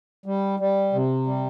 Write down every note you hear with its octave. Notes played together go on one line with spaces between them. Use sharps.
G3
G3
C3
G3